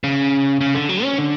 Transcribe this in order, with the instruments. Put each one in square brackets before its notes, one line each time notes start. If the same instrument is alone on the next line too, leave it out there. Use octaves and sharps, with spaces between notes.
[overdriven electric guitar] C#3
C#3
D3
F#3
C#4
D3